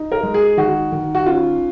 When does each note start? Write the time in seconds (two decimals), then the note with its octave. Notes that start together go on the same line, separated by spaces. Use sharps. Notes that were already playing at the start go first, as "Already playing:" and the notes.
Already playing: D#4
0.12 A#4
0.23 G#3
0.34 G#4
0.57 D#3 F#4
0.92 D#3
1.15 F#4
1.26 C#4 F4